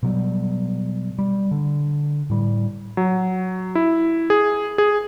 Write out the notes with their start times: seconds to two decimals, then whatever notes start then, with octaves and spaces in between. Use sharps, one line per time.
0.03 B2 F#3 G3
1.19 G3
1.51 D3
2.30 A2 G3
2.97 F#3
3.75 E4
4.30 G#4
4.78 G#4